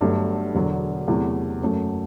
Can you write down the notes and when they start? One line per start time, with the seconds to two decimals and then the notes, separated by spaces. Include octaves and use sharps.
0.01 G1 G2 F#3 A3
0.54 E1 E2 D3 F#3
1.08 E2 C3 F#3 A3 E4
1.61 F#1 F#2 F#3 A3